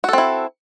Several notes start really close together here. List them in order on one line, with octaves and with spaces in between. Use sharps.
F#4 A4 C4 E4